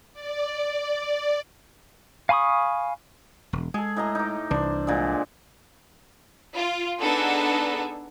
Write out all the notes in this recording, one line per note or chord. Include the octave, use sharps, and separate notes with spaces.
D5
F5 G#5 B5 C#6 D#6
E1
G#3 G#4 A4
A2 D#5 A#5
D#4 D6
C2 E3 D4 C5
A#2 D3 G#3
F4
B3 D4 D#4 G#4 A4 F#5